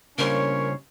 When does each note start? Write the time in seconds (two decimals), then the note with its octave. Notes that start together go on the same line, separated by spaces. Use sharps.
0.18 C#3 G3 A#3 C#4 D4 A#4 C5 C#5